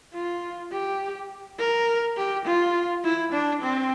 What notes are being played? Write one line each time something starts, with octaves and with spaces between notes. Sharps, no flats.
F4
G4
A#4
G4
F4
E4
D4
C4